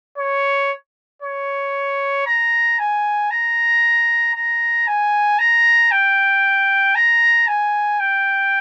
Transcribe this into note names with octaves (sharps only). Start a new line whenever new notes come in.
C#5
C#5
A#5
G#5
A#5
A#5
G#5
A#5
G5
A#5
G#5
G5